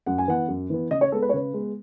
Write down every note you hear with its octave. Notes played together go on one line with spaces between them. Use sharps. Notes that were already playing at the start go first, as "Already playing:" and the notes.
F#2 F#5
G#5
E3 B3 F#5
F#2
E3 B3
C#3 D#5
C#5
G#3 B3 A4
B4
C#5
C#3 B4
G#3 B3